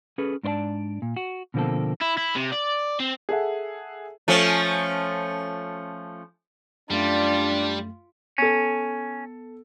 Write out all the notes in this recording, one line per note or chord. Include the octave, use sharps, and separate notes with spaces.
C#4 G#4 A4 B4
G#2 D4 C5 D5 A5
A#2
F#4
B2 D3 F3 A#3 C4 A4
E4
E4
C3
D5
C4
G#4 A4 E5 F#5
F3 A3 C#4
F#2 G3 A3 D4 F4
B3 C#4 A4